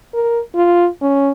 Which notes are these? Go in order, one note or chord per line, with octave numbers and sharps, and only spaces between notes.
A#4
F4
C#4